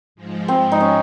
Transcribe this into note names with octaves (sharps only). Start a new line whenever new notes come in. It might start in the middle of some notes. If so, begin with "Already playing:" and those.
G#2 F3 G#3
C4
D#4
C#4